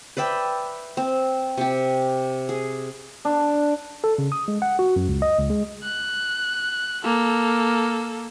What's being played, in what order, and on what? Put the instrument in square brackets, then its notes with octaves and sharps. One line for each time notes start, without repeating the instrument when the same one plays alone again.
[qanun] B4 D5 E5 G5
C4
C3 G4
G#4
[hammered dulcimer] D4
[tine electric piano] A4
C#3
D#6
G#3
F#5
F#4
F#2
C#2
D#5
C#2
G#3
[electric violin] F#6
A#3 A4